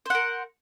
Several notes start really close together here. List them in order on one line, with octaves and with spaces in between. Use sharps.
C5 F#5 A#4